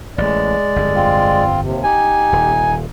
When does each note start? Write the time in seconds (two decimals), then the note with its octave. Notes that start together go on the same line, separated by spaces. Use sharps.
0.18 A1 G#3 D5
0.76 G1 F2
0.95 C4 F4
1.62 D#2 C3
1.84 D#4 G4 G#5
2.33 D#1